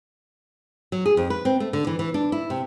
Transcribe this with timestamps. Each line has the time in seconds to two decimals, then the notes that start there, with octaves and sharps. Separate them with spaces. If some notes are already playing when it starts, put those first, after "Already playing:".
0.92 F#3
1.06 G#4
1.17 F2
1.30 B4
1.45 C4
1.60 A3
1.73 D3
1.87 E3
1.99 E3
2.14 D4
2.32 E4
2.50 C3